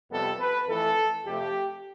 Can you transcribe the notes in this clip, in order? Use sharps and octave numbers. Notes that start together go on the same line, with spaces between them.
F2 C3 G3 B3 A4
B4
F2 E3 A3 A4
F2 C3 F3 A3 G4